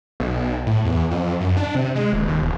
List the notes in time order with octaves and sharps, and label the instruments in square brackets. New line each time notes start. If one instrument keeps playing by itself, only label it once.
[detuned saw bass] B1
A2
E2
F2
F#2
D4
C3
G#3
D#1
D#2
E1